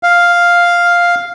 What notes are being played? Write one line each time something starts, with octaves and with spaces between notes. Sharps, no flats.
F5